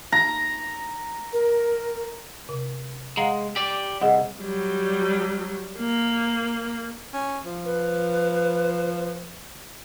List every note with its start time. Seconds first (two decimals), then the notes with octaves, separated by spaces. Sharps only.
0.12 A#5
1.33 A#4
2.49 C3
3.17 G#3 F5 F#5 A#5
3.56 G4 D5
4.01 C2 G#4 D#5 F#5
4.42 F#3 G3
5.78 A#3
7.13 C#4
7.45 F3
7.65 B4